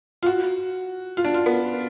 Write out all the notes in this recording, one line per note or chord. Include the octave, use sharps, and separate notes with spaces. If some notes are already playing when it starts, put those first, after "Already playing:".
F4
F#4
F4
D4
F4
B3